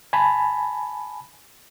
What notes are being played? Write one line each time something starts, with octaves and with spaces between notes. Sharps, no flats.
G#5 A5 B5